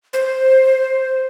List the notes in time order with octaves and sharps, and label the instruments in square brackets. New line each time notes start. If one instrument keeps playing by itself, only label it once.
[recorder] C5